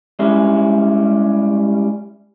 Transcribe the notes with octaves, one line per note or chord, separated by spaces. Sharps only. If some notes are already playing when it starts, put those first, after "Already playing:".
G3 G#3 C#4 E4